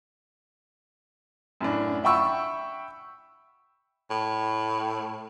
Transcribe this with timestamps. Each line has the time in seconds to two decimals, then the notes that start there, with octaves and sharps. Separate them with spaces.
1.61 F#2 A2 D4
2.04 E5 F#5 G5 B5 C#6 E6
4.11 A2